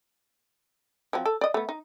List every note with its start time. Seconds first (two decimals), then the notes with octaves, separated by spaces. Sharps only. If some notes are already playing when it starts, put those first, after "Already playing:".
1.13 F3 F#3 C4
1.26 A4
1.41 D5 D#5
1.54 A3 B3
1.69 D#4